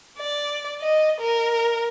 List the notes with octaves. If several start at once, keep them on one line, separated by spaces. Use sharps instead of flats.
D5
D#5
A#4